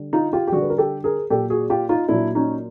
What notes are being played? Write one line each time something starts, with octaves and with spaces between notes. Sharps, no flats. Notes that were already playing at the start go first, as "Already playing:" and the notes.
Already playing: D3 G3
D#4 F4
F4 G4
G4
D3 G3 F#4 G#4
B4
A#4
G4 A4
G#4 A#4
A#2 F#3 G4 A4
F#4 G#4
F4 G4
D#4 F4
A#2 F#3 D4 E4
C#4 D#4